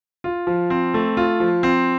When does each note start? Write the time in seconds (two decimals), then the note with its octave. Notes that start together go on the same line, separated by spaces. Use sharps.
0.24 F4
0.47 F3
0.70 C4
0.94 A3
1.17 F4
1.40 F3
1.63 C4